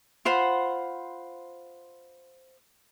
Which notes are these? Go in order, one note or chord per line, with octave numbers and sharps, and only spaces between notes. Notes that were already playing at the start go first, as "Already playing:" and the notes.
F4 C5 F#5 B5